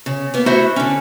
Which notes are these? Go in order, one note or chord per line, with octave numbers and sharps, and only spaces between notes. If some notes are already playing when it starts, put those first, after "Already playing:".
C#3
A#3 B3
A3 E4 F#4 C5 E5 F#5
D3 C#4